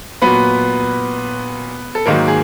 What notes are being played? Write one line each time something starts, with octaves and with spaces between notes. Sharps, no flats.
A#2 F#3 B3 B4
A4
G#2 D#3 F#3 A#3 A#4
G#4